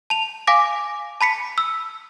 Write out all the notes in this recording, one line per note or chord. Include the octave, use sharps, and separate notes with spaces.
A5 F7
F5 G#5 D6 A#6
A5 B5 B6 C#7
E6